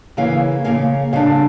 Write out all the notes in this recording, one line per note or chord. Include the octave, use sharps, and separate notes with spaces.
C#3 E3 A#3 C#4 F5
C#3 E3 A#3 C#4 F5
C#3 G3 D4 F5